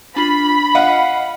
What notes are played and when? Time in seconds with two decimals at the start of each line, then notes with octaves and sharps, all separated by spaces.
0.16 D4 F4 B5 F#7
0.75 D#5 F5 F#5